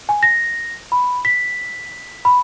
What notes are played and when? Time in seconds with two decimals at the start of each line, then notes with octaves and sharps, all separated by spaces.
0.09 G#5
0.23 A#6
0.92 B5
1.25 B6
2.25 B5